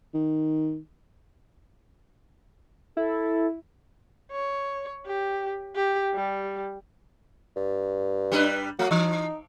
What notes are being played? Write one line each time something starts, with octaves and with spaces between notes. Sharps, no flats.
D#3
E4 A4
C#5
G4
G4
G3
G2
G3 D4 B4
F#3 A3
E3 D#4